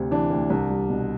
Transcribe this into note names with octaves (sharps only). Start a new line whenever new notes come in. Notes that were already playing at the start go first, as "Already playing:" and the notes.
Already playing: D2 C3 C4
E3 D4
D2
C2 D4
G3
B2